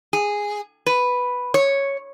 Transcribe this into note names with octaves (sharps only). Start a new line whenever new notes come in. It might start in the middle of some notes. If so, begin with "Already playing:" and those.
G#4
B4
C#5